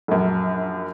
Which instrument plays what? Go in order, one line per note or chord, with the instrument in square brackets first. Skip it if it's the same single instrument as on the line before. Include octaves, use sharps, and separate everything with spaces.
[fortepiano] A#1 F#2